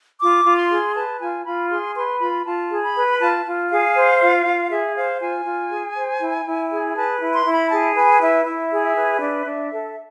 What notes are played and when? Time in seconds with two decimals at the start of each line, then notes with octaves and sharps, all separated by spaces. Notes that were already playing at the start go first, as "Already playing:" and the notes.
0.20 F4 D6
0.45 F4
0.57 C6
0.71 G#4
0.95 B4 A5
1.20 F4 G#5
1.45 F4 B5
1.70 G#4 C6
1.95 B4 C6
2.20 F4 B5
2.45 F4 A5
2.70 G#4
2.83 B5
2.96 B4
3.20 F4 A5
3.45 F4
3.70 G#4 F5
3.95 C5
4.21 F4
4.45 F4
4.70 G#4 E5
4.96 C5 F5
5.20 F4 G#5
5.45 F4
5.70 G#4
5.95 C5
6.20 E4
6.46 E4
6.70 G#4
6.95 B4 A5
7.20 E4
7.33 C6
7.45 E4
7.52 B5
7.70 G#4 A5
7.95 B4 G#5
8.21 E4 E5
8.45 E4 E5
8.71 G#4
8.83 E5
8.96 B4
9.20 D4 E5
9.46 D4
9.71 A4